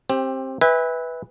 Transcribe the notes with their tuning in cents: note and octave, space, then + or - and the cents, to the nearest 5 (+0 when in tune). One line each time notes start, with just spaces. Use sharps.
C4 +20 G4 +0
B4 +0 E5 -25 G#5 -40